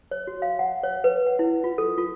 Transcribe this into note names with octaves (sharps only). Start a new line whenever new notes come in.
C#5
F#4
F5
F#5
C#5
B4
F#5
E4
F4
A4
F4